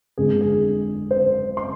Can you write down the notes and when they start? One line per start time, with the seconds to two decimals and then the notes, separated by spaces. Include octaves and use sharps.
0.17 G1 F2 D3 G#3 G#4
0.41 G#4
1.11 C5
1.57 C6